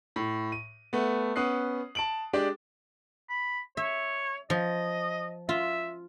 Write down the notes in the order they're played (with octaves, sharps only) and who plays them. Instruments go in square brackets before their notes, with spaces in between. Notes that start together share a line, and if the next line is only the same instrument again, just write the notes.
[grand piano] A2
D#7
A3 B3
B3 C#4 D#6 F#6 C7
A5 D7 F#7
G#3 D4 G4 D5
[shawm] B5
[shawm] C#5 [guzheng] E5
[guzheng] F3 [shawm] D#5
[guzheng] F4 [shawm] E5